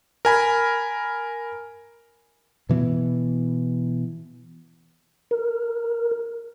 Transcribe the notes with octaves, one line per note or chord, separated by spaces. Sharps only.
A#4 G#5 B5
B2 E3 B3
A#4